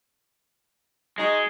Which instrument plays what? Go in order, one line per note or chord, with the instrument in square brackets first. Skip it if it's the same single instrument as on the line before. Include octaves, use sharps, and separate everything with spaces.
[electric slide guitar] G#3 [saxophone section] D#4 F#4 D#5